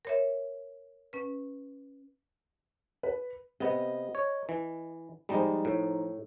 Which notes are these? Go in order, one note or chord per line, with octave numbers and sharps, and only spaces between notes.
A#4 C#5 E5
C#4 B4
B4
C3 B3 D#5
C#5
E3
F3 G3 G#3 D#4 A5
A2